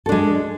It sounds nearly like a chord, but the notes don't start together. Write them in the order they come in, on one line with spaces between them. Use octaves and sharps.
A4 D4 G#3